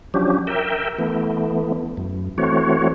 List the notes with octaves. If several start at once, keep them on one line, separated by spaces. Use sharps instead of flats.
F3 F#3 C#4 D4 G4
A#4 E5 G5
E3 A3 B3
F#2
E3 A3 C4 F#4 C#5